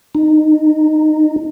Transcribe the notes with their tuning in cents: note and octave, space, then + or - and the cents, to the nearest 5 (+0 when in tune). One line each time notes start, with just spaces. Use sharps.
D#4 -15